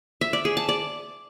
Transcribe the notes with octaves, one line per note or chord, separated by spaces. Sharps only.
E5
D5
G#4
A5
D5